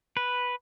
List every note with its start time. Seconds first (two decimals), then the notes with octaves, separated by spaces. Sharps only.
0.17 B4